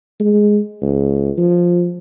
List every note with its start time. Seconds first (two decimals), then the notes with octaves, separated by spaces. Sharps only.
0.20 G#3
0.82 C#2
1.38 F3